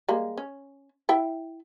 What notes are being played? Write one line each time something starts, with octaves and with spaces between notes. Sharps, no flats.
G3 G#3 A#3
C#4
E4 E5 G5